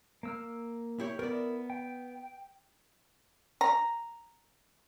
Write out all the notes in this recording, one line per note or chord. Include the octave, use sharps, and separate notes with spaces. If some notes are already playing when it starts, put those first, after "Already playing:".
A#3 E6 F6
E4 G4 C#5
B3 E4 A#4 D5
G5
A#5